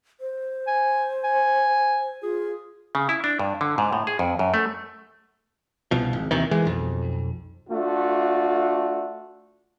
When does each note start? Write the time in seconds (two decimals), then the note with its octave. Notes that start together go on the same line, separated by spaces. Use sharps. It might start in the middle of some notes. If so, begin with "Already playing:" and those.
0.20 C5
0.67 G#5
1.24 G#5
2.23 F4 G#4
2.95 C#3
3.09 E4
3.24 D4
3.39 G2
3.61 D3
3.78 G#2
3.92 A2
4.07 G#4
4.19 F2
4.39 F#2
4.54 A3
5.91 C2 B2 F3
6.13 G#1
6.31 D#2 C3 D#3 E3
6.51 E3 G#3
6.65 B1 F2
7.70 A3 D4 F4 F#4